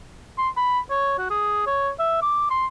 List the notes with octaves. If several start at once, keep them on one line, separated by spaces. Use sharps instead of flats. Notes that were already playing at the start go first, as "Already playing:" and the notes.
C6
B5
C#5
F#4
G#4
C#5
E5
D6
C6